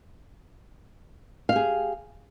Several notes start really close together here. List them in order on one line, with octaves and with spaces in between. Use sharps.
F5 G4 G#4